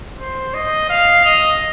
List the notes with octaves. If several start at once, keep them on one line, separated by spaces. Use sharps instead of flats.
C5
D#5
F5
D#5